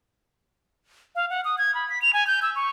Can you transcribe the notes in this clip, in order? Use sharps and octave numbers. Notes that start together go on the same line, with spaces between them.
F5
F#5
D#6
G#6
B5
B6
F7
G#5
G6
E6
C#6